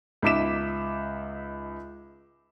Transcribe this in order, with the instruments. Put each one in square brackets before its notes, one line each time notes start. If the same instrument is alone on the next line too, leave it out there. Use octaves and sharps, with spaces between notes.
[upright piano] C#2 D#4 E5 D6 B6 E7